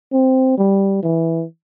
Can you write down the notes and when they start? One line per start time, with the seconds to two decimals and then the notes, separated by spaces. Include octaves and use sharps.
0.13 C4
0.58 G3
1.03 E3